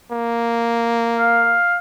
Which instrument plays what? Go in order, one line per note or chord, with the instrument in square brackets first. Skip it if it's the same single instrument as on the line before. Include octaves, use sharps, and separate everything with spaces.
[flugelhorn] A#3
[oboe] F5